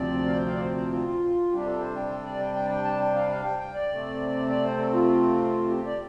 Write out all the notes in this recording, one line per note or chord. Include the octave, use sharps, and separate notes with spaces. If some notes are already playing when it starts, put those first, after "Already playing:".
Already playing: D2 C3 F3 C4 D5
F5
G5
F5
D5
C5
C5
F4
C3 G3 D4 G4
A4
C5
G5
A4
D5
G5
G5
A5
G5
A5
G5
F5
F5
G5
G5
D5
C3 A3 C4
D5
C5
A4
F4
G4
D5